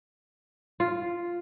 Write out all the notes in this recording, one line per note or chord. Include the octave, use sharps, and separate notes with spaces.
F4